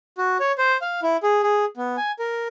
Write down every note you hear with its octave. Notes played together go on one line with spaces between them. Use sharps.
F#4
C#5
C5
F5
E4
G#4
G#4
B3
G#5
A#4